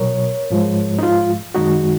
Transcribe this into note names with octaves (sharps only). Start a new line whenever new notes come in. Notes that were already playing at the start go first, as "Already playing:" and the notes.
Already playing: B2 F#3 A#4 C#5
G#2 F3 G#3
D#4
F4
F#2 D#3 G#3 D#4 F#4